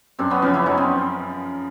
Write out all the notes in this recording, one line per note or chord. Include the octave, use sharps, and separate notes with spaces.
F#2 C4 D4
B3 C#4
C#3 F3 B3 C#4
D4 E4
F#2 C#4 D#4
C4